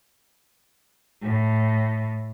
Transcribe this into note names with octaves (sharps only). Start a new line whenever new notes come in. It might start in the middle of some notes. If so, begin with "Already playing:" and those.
A2